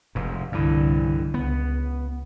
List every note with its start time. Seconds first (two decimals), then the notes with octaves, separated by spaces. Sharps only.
0.15 F1 G#2
0.52 C2 G2 D3 E3
1.34 C#2 B3